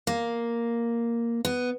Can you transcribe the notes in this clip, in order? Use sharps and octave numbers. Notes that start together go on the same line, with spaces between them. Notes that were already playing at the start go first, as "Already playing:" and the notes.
A#3
B3